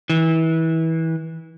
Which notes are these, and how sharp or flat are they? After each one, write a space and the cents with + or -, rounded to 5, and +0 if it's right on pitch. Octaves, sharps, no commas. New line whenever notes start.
E3 -25